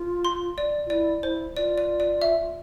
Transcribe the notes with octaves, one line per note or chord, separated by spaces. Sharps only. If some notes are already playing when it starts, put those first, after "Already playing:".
Already playing: F4
C6
D5
F4
E4 D5
E4 C5
F4 D5
D5
D5
E5